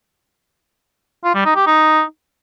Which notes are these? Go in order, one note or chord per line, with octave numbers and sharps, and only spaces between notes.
F4
G3
D#4
G4
D#4